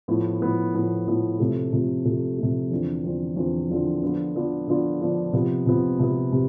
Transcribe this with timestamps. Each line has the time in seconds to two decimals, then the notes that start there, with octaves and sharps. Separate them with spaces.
0.08 A2 F3 B3
0.41 A2 F3 B3
0.74 A2 F3 B3
1.07 A2 F3 B3
1.40 C3 F3 A3
1.73 C3 F3 A3
2.05 C3 F3 A3
2.38 C3 F3 A3
2.71 E2 D3 F3 C4
3.03 E2 D3 F3 C4
3.36 E2 D3 F3 C4
3.70 E2 D3 F3 C4
4.02 D3 F3 B3 D4 F4
4.35 D3 F3 B3 D4 F4
4.67 D3 F3 B3 D4 F4
5.01 D3 F3 B3 D4 F4
5.33 C3 F3 B3
5.66 C3 F3 B3
5.99 C3 F3 B3
6.32 C3